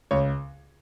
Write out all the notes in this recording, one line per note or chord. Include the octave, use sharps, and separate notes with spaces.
C#2 C#5